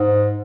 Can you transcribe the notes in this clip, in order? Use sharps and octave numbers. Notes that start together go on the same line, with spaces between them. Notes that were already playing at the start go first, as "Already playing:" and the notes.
Already playing: G#2